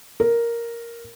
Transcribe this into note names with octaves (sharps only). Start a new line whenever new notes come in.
A#4